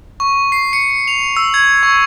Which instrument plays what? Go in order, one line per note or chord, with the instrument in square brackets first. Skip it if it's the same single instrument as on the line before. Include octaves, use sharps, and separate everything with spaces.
[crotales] C#6
C7
C#7
F7
E6
G#6
C#6